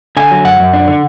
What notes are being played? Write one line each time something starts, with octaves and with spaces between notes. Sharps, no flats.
D3 G#5
F#3
F#2 F#5
F#2
D4
D3